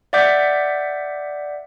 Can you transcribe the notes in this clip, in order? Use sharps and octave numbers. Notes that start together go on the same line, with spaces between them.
D5 E5 F#5 D6 G6 B6